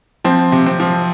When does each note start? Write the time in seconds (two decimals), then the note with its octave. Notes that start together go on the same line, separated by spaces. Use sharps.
0.25 F3 C4
0.52 C3
0.66 C4
0.80 F3